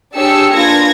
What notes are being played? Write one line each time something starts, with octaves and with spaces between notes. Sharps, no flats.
D4 G4 G#4 C#5 E6 C#7
A#3 D4 F4 B4 G#6 A#6